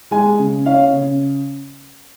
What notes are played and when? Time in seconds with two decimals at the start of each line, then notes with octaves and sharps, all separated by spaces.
0.11 G#3 G#5
0.39 C#3
0.66 C#4 F5
0.93 C#3